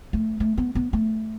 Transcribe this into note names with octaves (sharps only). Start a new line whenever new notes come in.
A3
A3
B3
B3
A3